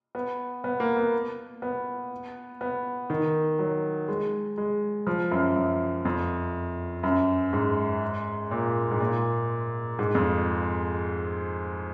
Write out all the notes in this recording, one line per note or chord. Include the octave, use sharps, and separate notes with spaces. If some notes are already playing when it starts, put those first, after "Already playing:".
B3
B3
A#3
B3
B3
B3
D#3
F#3
G#3
G#3
F3
F#2
F#2
F2
F#2
G#2
A#2
G#2
A#2
G#2
F2